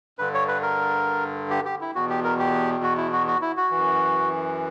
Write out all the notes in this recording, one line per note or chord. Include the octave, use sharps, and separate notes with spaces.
G2 D3 B4
C#5
B4
A#4
G4
G4
E4
E2 B2 F#4
G4
A#4
G4
F#4
E4
F#4
F#4
E4
F#4
F#2 E3